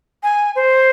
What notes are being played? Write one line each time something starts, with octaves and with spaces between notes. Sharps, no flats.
G#5
C5